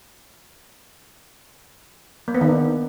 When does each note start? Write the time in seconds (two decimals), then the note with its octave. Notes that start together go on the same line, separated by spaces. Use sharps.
2.28 A#3
2.34 B3
2.41 D#3
2.48 D4